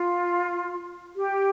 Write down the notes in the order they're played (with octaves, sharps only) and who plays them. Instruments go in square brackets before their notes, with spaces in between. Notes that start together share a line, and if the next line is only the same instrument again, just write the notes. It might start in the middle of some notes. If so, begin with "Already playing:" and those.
Already playing: [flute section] F4
G4